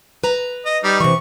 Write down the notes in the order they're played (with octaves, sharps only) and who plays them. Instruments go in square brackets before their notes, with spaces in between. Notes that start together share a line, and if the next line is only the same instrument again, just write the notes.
[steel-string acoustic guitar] B4 A#5
[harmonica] D#5
G3 D#4
[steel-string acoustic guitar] C3 E3 [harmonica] C#6